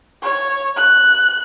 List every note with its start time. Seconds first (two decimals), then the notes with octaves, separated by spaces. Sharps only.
0.22 C#5
0.76 F#6